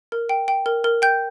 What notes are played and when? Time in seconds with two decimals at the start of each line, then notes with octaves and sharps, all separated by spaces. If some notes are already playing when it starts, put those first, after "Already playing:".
0.12 A#4
0.29 G5
0.48 G5
0.66 A#4
0.84 A#4
1.02 G5 G6